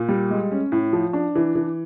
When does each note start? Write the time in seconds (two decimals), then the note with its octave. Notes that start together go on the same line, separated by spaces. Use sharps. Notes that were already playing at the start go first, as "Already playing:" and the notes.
Already playing: A#2
0.09 G3
0.30 G#3
0.51 C#4
0.72 A2
0.93 F3
1.13 D4
1.35 E3
1.55 E3